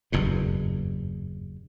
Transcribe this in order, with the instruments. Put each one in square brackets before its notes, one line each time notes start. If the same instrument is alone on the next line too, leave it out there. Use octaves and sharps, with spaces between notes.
[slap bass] F#1 E2 G2 B2